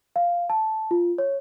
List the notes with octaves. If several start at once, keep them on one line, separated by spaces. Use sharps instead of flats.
F5
A5
F4
C#5